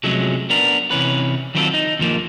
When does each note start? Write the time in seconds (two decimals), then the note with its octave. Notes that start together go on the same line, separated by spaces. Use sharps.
0.03 C3 F3 F#3 G#3 A3 C#4
0.50 B3 D4 A#4
0.91 C3 E3 C#4 B4
1.55 D#3 F#3 B3 C4 F4 A4
1.74 D#4
1.99 D#2 F3 A#3